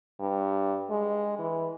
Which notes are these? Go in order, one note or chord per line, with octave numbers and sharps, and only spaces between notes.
G2
G#3
E3